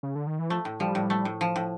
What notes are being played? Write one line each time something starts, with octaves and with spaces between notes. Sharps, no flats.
C#3
D3
D#3
E3
F3 A3
A2
F3 G3
A2
A3
A2
F3
A2